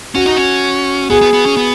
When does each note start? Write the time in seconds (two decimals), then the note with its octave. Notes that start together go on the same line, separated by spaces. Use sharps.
0.15 C#4 F#4
0.26 D#4
0.36 C#4
1.10 B3 G#4
1.21 B3
1.33 B3
1.46 C#4
1.57 B3